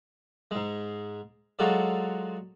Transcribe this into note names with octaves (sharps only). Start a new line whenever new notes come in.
G#2 G#3
F#3 G#3 F4 F#4 A4 D5